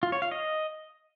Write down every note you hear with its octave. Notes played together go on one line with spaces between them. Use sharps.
F4
C#5
F5
D#5